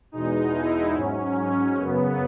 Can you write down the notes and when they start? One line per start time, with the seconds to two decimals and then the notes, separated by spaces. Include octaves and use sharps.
0.12 E2 B2 G#3 D#4
0.53 E4
0.95 G#2 F#3 C#4
1.78 F#2 C#3 F#3 B3